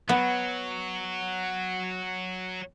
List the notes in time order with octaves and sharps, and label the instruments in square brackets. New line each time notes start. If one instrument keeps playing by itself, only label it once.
[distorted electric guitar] F#3 [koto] B3